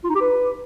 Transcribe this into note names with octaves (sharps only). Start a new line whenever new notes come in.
F4
D#4
G4
B4